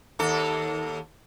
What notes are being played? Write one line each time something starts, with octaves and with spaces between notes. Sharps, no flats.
D#2 A4